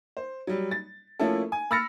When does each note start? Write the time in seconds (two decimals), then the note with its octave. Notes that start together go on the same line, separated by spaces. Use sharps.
0.17 C5
0.47 F#3 G3
0.71 A6
1.19 F3 A3 A#3 C#4 E4 A4
1.52 G#5
1.71 B5 E6 F6 A6 A#6 C#7